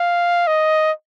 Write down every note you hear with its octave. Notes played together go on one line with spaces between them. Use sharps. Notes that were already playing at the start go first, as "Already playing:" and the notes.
Already playing: F5
D#5